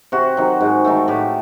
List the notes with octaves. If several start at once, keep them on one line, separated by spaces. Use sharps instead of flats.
C3 F#4
D#3 F#3
G#2
D#3 F#3 A3
A2 G4